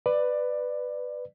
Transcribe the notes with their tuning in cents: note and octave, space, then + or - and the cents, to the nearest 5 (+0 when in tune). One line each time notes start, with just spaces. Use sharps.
B4 +10 D5 +15